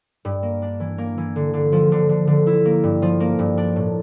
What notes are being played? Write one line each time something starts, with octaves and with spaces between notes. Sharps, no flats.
G2
A#3
D4
E3
A#3
E3
D3
D3
F3
D3
D3
D3
E4
A#3
G2
F3
A#3
G2
D4
A2